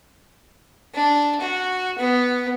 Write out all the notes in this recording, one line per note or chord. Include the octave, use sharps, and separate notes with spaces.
D4
F#4
B3